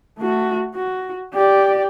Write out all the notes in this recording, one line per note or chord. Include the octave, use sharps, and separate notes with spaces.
A3 F#4
F#4
G4 D5